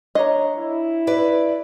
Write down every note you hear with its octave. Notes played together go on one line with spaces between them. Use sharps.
D4 C#5 D#5 A#5
E4
B4 D5